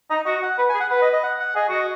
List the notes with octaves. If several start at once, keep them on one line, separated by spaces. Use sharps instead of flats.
D#4 D#5
F#4 D#5
F#5
B4
G#5
G#4
F#5
B4 F#5
D#5
D#5
F#5
F#5
G#4 D#5
F#4 D#5